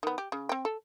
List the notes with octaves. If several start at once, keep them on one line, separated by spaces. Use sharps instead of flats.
D#3 B3
G4
C#3
C4 G5
A4